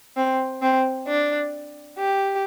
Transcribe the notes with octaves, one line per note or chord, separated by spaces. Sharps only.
C4
C4
D4
G4